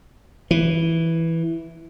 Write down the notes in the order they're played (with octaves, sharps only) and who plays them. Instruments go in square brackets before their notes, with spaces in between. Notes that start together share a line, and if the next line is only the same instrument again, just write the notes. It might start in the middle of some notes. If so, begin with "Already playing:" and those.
[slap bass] E3